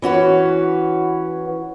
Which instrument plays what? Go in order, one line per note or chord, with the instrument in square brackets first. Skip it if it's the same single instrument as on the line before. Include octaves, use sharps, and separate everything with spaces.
[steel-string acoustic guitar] E3 C#4 F#4 B4